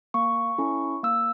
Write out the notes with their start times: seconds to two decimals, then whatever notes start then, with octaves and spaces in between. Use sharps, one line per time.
0.14 A#3 C#6
0.58 C#4 E4 A4
1.03 A#3 E6